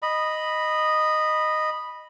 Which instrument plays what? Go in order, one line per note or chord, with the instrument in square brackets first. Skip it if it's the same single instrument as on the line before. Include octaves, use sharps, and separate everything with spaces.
[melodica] D#5 B5